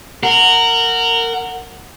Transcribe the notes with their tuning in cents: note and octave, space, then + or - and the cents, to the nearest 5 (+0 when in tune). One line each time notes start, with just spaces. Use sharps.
A#4 -20 F#5 +0